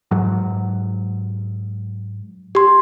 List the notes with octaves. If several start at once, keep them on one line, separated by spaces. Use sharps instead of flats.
G#2 F#3
G4 C6